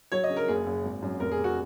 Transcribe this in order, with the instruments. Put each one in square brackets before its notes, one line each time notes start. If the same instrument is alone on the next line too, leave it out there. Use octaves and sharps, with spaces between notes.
[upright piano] F#3 C#5
D#5
C#3
A#4
F#1 G#4
F#1
G#1
F#2
F1 A#4
G#4
C3
F#4